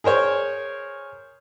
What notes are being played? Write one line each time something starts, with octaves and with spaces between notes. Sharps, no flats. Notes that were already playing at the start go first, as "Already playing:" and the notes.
G#4 A#4 C5 C#5